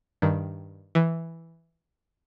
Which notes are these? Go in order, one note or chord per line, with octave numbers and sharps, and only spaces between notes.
G2 D#3
E3